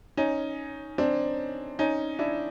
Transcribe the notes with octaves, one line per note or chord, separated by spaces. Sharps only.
C#4 D#4
C4 D4
C#4 D#4
D4 E4